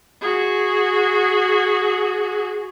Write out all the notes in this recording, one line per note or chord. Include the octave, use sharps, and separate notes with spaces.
F#4 G#4